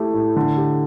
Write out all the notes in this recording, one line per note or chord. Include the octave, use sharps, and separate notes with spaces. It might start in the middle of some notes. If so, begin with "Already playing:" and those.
Already playing: A3 E4 G4
A2
D3
G4